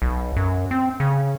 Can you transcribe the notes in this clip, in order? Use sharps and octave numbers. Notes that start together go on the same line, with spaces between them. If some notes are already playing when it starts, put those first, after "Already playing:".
B1
F#2
C4
C#3